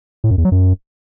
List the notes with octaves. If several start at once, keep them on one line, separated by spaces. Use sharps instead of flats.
A2
F#2
E2
F#3
F#2